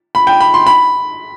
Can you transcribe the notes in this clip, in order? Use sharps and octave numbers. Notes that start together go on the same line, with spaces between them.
B5
G5
B5
C6
B5